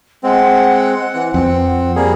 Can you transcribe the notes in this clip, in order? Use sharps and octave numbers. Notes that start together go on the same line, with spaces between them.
G#3 C4 F#5
E3
F2 C4
G3 A#3 G#4